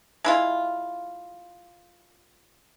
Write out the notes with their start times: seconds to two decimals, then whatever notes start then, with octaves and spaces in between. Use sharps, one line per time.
0.24 G#3 E4 F4